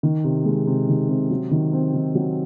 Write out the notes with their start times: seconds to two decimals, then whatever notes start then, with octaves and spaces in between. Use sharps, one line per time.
0.03 D#3
0.24 C3
0.45 G#3
0.67 C3
0.88 D#3
1.09 C3
1.31 F#3
1.51 D#3
1.73 C4
1.94 D#3
2.15 F#3